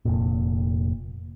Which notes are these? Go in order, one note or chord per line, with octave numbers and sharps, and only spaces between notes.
F1 A#2